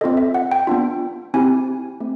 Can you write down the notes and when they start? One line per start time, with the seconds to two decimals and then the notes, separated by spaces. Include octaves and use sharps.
0.01 C4 F4 A4 D#5
0.17 E5
0.34 F#5
0.52 G5
0.67 B3 D4 F4
1.34 C4 E4 G4 G#5
2.00 A3 C4